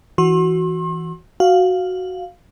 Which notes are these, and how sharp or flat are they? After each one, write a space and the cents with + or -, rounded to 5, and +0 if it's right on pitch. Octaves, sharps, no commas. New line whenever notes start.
E3 +0 F#4 +0 C6 +40
F#4 +0 F5 +0